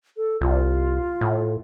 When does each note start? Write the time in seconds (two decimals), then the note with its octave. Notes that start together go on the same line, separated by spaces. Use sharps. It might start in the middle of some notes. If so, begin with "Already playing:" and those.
0.17 A4
0.41 C2 F4
1.21 A2